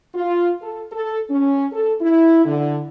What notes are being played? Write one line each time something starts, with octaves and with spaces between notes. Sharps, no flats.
F4
A4
A4
C#4
A4
E4
D3